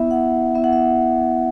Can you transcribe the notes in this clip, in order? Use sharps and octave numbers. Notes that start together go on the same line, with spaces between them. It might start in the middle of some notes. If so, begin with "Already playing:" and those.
Already playing: B3 E4 E5
F#5
B3 E4 E5
F#5
E5